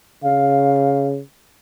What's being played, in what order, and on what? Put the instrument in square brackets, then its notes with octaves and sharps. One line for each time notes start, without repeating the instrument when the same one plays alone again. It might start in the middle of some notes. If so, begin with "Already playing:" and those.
[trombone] C#3 [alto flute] F5